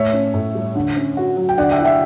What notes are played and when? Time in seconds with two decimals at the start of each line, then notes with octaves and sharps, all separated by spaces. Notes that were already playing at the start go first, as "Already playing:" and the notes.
Already playing: A2 A3 C#5 E5
0.13 C#4
0.34 A2
0.55 G3
0.75 D3
0.97 C#4
1.17 F#4
1.37 F#3
1.49 G5
1.58 D3 D5 F#5
1.71 E5 G5
1.78 E4 F#5
1.85 E5 G5